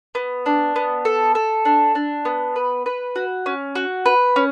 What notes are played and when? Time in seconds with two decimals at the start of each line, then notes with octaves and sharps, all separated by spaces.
0.15 B3
0.46 D4
0.76 B3
1.05 A4
1.35 A4
1.65 D4
1.95 D4
2.25 B3
2.56 B4
2.86 B4
3.16 F#4
3.46 C#4
3.75 F#4
4.06 B4
4.36 C#4